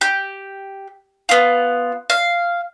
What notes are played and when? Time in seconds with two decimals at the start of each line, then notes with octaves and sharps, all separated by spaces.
0.01 G4
1.29 B3 F4
2.10 F5